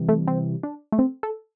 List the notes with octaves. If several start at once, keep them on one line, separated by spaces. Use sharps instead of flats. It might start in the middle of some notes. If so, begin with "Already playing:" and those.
Already playing: C3 E3 G3
A3
C4
D4
A3
C4
A4